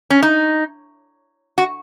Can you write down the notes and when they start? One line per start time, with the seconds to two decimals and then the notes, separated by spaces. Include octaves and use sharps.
0.10 C#4
0.23 D#4
1.58 F#4